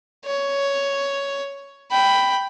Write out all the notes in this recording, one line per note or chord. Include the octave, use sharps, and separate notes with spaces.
C#5
G5 B5